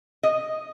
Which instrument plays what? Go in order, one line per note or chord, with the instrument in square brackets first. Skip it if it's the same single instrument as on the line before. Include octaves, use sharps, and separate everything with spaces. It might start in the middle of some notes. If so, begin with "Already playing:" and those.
[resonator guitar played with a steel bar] D#5